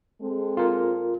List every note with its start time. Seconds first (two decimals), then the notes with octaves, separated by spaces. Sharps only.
0.20 G#3 C4 A4
0.57 F4 A#4